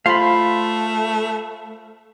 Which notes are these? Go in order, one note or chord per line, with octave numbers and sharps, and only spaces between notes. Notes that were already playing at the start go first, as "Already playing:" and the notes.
A3 F4 C5 F5 B5 C6